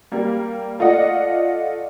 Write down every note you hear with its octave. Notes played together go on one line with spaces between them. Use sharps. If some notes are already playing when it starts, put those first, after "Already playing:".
G3 A#3
A3 F4 D5 D#5 F#5